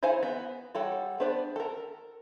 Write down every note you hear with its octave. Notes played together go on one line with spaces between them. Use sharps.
D#4 E4 C5 F5 G#5
B3
G3 F#4 A4 C#5 F#5
B3 D4 B4 C5 D5
A4 A#4